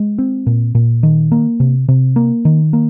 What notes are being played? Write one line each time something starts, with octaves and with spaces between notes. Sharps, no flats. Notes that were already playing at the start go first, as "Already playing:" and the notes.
Already playing: G#3
C4
A#2
A#2
D#3
A#3
C3
C3
A#3
D#3
A#3